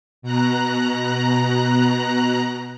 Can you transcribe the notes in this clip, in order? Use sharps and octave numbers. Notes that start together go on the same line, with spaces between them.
B2 A#5 F#6